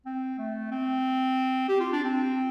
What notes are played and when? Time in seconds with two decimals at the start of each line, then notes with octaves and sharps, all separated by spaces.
0.06 C4
0.38 A3
0.72 C4
1.69 G4
1.80 F4
1.93 D4
2.04 C4